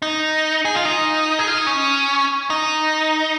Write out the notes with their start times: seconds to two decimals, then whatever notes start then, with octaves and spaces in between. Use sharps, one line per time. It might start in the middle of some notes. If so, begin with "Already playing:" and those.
0.02 D#4
0.65 G#4
0.75 F4
0.85 D#4
1.39 G#4
1.48 F4
1.58 D#4
1.67 C#4
2.50 D#4